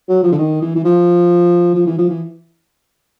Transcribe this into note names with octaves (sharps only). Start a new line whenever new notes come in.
F#3
F3
D3
D#3
E3
E3
F3
F3
E3
F3
E3